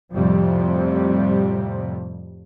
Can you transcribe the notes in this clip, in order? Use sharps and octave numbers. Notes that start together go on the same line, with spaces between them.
F2 A2 C3 F3 G3